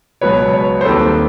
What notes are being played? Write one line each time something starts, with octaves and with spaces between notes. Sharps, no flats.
C#2 B2 F#3 B3 B4 C#5
B4 C#5
C5
D#2 D#3 G3 C4 A4 B4